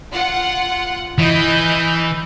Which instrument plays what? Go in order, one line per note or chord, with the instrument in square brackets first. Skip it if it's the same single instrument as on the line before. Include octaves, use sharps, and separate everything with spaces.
[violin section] F4 F#5
[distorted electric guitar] E3 [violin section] D#5 B5 G6